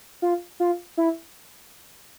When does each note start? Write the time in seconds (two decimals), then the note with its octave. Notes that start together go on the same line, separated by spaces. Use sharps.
0.22 F4
0.60 F4
0.97 E4